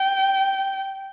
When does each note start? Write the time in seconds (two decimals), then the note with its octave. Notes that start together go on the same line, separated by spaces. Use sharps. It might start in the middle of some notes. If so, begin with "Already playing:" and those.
Already playing: G5